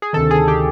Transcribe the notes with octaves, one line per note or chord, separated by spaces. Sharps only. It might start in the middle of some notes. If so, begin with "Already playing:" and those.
G#4
D2 C3 D#3 A4
G#4
G4